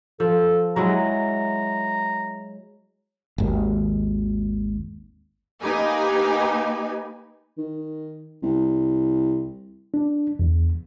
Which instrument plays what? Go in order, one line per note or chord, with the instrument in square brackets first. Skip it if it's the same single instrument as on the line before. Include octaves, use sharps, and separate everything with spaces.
[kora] F3 [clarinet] A4
[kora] F#3 G#3 E4 [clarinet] A#5
[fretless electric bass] G#1 D#2
[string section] A#3 D#4 G4 B4 G#5
[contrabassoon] D#3
C2
[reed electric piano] D4
E2